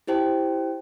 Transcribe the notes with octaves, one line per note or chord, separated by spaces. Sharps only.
E4 G4 C5 G5 A5